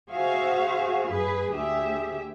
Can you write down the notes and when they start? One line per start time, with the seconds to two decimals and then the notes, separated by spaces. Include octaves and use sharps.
0.10 F#4 G#4 C5 E5 F5
1.08 F#2 G#4 B4
1.51 D2 G4 G#4 E5